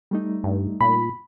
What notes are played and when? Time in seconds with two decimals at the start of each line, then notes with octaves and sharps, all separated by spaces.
0.11 G3 A3 D#4
0.44 G2
0.81 A#2 B5